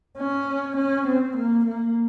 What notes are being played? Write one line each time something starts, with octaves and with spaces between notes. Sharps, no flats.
C#4
C#4
C4
A#3
A#3